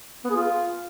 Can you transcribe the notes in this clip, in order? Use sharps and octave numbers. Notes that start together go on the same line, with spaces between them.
B3
G#4
F4